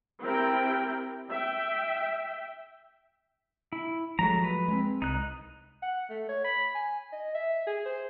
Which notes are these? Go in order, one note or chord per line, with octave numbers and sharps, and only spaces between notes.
C4 E4 G4 A#4 G5
E5 G5
E4
F3 F#3 G#3 A3 A#5
B4
G#3 B3 C4
C2 D#4 F#6
F#5
A3
C#5
B5
G#5
D#5
E5
G#4
C5